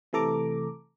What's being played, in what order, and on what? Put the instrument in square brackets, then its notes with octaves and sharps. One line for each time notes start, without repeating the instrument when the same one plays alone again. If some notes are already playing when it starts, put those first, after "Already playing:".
[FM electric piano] C3 E3 A3 A4 A#5 D6